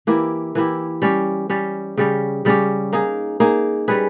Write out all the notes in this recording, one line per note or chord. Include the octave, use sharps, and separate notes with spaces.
E3 A#3 E4 G4
E3 A#3 E4 G4
G3 C#4 G4
G3 C#4 G4
C#3 G3 C#4 G4
C#3 G3 C#4 G4
A#3 D#4 G#4
A#3 D#4 G#4
G3 C#4 G#4 B4